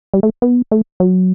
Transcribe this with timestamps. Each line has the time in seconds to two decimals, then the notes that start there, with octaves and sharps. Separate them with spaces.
0.14 G3
0.23 A3
0.42 B3
0.71 A3
1.00 F#3